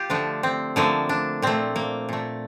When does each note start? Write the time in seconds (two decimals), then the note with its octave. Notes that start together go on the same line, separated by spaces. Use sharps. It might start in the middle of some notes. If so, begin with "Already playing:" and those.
Already playing: F4 G4
0.10 D3 F3 A3 D4
0.43 C4
0.76 D3 F3 A3 A#3
1.09 D4
1.42 A#2 A3 C4
1.76 A#3
2.09 A#2 A3